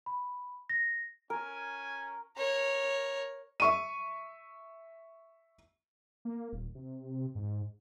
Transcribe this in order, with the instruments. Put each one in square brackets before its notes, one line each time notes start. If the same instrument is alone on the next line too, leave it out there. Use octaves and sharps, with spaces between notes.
[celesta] B5
A#6
[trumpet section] C#4 G#5 [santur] A#4
[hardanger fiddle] A#4 C#5
[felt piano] E5 C#6 D#7
[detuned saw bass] A#3
D#1
C3
G#2